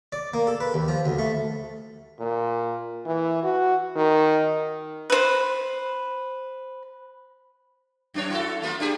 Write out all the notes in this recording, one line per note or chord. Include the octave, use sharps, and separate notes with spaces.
D5
A#3
A4
B4
D#2
F3
D2
A3
A#2
E3
F#4
D#3
B4 C5
F#2 D4 C#5
E4 F#4 A4
A3 A#3 F4
D4 G4 G#4